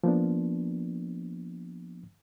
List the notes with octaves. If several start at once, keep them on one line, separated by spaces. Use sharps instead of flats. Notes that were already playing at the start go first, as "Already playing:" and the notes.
F3 A#3 B3 D4